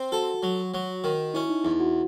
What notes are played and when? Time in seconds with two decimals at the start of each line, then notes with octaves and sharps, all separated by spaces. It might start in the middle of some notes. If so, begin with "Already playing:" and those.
Already playing: C4
0.12 F#4 A4
0.43 F#3
0.74 F#3
1.04 D#3
1.34 C#4 E4
1.49 D#4
1.64 E2 E4
1.80 F#4